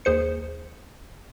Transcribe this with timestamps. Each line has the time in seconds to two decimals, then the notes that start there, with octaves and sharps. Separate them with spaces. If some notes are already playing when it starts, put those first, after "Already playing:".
0.05 D#2 G#4 C5 C#7